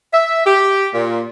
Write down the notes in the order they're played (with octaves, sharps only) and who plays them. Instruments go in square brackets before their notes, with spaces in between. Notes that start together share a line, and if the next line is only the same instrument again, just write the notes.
[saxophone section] E5
G4
A#2